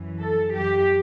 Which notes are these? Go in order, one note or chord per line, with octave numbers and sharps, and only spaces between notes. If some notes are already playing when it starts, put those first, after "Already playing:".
Already playing: F#2 E3
A4
F#2 E3 G4